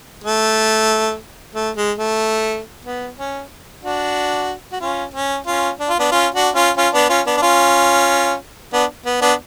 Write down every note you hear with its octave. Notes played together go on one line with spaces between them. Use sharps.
A3
A3
G#3
A3
B3
C#4
D4 F#4
F#4
C#4 F4
C#4
C#4 F4
D4
F4
B3 D4
C#4 F4
D4 F#4
C#4 F4
C#4 F4
B3 D4
C#4 F4
B3 D4
D4
C#4 F4
B3 D4
B3
B3 D4